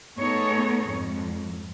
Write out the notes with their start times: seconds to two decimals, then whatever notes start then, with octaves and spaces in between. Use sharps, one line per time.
0.19 A3 B3 D#4 G#4 A4 C#5
0.88 F2 G#2